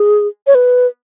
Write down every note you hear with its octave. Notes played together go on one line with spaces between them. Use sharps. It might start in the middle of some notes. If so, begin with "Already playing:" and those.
Already playing: G#4
C#5
B4